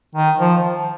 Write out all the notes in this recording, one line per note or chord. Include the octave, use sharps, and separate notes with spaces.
D#3
F3